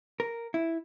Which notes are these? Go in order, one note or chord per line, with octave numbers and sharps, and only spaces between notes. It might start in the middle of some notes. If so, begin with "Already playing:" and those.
A#4
E4